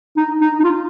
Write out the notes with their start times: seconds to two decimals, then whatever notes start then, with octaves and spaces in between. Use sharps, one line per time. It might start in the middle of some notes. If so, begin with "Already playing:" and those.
0.17 D#4
0.41 D#4
0.60 D#4
0.64 F4